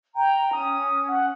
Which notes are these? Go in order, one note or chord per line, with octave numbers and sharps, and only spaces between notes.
G5 A#5
C#4 D#6
F#5